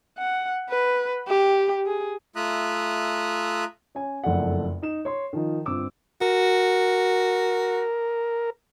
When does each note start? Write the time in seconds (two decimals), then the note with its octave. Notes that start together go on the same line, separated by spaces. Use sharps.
0.19 F#5
0.70 B4
1.28 G4
1.86 G#4
2.36 A3 F4 E5 A#5 D#6 F#6
3.95 C#4 C#5 G#5
4.24 F#1 F2 A3 D5 F#5
4.82 D#4 E7
5.05 C#5 C6
5.33 D#3 F3 D#4
5.66 G1 C4 F4 D6 E6
6.21 F#4 A#4